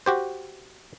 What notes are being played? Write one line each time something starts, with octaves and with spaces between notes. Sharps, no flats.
F#4 G4 C5